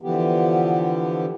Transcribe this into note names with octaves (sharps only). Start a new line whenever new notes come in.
D3 E3 F3 B3 G4